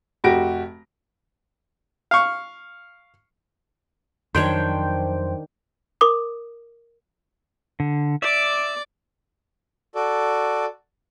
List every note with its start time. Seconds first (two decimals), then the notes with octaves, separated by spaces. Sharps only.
0.24 F1 F#4 G4 A#6 D7
2.11 F5 C#6
4.35 F2 D#3 F#3 D4 C5 C#5 G5
6.01 A#4 D6 D#6
7.80 D3
8.22 D5 E5 D6
9.95 F#4 A4 D5